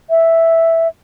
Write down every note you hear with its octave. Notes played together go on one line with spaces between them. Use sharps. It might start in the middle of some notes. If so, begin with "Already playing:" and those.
E5